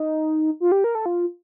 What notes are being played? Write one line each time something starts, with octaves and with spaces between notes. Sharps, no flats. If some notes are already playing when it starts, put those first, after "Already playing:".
Already playing: D#4
F4
G4
A#4
A4
F4